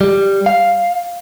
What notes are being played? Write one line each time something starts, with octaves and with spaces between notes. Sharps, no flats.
G3
F5